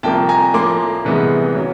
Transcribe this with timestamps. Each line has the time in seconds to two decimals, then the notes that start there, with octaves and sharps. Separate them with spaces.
0.03 C2 C3 F3 A#3 G5 A5
0.29 G#5 A#5
0.54 A2 F3 A#3 C6 D6
1.05 C2 C3 E3 G#3 B3
1.55 C#3 F#3